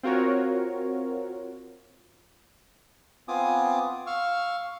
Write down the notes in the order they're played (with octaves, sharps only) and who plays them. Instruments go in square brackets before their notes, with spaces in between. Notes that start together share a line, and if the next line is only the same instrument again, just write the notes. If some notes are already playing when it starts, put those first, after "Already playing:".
[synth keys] C4 F4 F#4 A#4 C#5
[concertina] B3 C4 F4 G#5 D6 D#6
F5 C#6 E6 F6